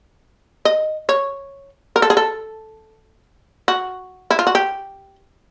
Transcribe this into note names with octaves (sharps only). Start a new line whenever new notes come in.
D#5
C#5
A#4
A4
G#4
A4
F#4
E4
F4
F#4
G4